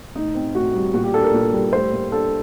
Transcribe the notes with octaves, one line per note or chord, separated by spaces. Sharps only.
A2 D#4
C4
A2 F#4
G3
A#2 F#4
G4
D4 A4
A#4
A#2
G3
A2 C5
A#3
D4 A4